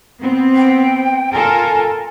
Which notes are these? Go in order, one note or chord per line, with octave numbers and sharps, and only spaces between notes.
B3 C4
G5
F4 A4 A#4 G#5